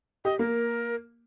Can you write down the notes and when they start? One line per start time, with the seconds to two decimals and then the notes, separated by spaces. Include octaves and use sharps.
0.25 G4 D#5
0.39 A#3 A#4